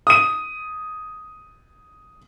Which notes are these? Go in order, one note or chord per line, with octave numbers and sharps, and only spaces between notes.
D#6 D#7